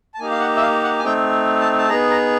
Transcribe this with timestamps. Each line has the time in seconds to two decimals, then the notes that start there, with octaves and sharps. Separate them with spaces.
0.14 A5
0.19 A#3 D#4 G4 G#5
0.31 F5
0.40 F#5
0.56 E5
0.61 F5
0.84 F#5
0.99 G#5
1.04 A3 C4 D#4 G5
1.60 A5
1.78 A5
1.89 B3 D#4 G#4 A#5
2.10 A#5